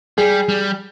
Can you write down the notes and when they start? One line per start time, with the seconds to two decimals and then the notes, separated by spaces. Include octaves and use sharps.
0.18 G3 G#4
0.49 G3